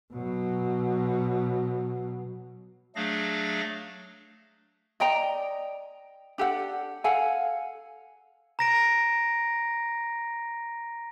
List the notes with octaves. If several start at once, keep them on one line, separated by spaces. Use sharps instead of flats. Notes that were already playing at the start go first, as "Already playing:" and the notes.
B2 F#3
F#3 A3 D4 G#4 F5 A#6
D5 D#5 G5 A#5
D4 G4 A4 F#5
A4 F5 F#5 G#5
A#5 A#6 D7